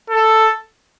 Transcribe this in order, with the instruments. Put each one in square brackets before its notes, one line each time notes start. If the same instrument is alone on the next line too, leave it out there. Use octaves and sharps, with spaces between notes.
[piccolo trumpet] A4